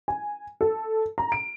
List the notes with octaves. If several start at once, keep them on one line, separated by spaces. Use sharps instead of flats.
G#5
A4
A#5
D7